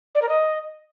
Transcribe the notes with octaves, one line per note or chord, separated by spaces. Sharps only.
D5
A#4
D#5